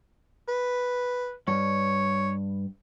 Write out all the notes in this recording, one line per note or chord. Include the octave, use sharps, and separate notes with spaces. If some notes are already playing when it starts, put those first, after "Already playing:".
B4
G2 C#5